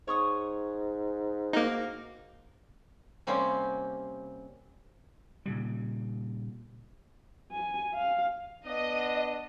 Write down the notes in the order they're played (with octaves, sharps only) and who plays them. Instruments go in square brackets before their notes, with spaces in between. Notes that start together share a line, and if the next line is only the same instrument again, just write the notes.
[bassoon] G#2 [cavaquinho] C#5 C#6 D#6
[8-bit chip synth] A#3 D#4 [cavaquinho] F#4 F5 D6
[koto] C3 G3 A#3 C4 C#4
[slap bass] A#2 C#3 G3
[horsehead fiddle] G#5
F5
[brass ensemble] B3 D4 [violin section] D#5